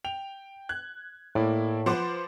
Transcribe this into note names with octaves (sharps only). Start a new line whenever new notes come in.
G5 F7
F#6 G#6
A2 A#3 E4 D5
F3 B4 C5 F#5 C6 D6